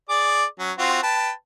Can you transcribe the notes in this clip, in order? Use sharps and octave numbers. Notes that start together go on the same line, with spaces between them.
G#4 D5 D6
F#3 C#4
C4 F4 F#4
B4 G5 A5